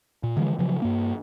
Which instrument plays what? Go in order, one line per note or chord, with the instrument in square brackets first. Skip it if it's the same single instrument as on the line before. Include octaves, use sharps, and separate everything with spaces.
[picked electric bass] A#2
D3 E3 F3 G#3
C#3 F3 F#3
G2 A#3